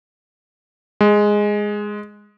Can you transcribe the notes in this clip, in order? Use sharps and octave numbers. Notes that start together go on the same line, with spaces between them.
G#3